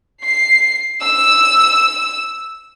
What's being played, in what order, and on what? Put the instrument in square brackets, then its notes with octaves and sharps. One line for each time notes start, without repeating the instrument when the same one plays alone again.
[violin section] C7
E6